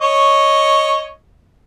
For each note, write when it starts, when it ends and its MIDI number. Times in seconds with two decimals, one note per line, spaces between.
0.02 1.11 73
0.02 1.11 75
0.02 1.11 85